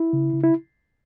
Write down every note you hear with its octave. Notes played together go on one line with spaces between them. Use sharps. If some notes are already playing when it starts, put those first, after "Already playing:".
Already playing: E4
C#3
C#3
E4